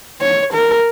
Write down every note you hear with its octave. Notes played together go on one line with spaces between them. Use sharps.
C#5
A#4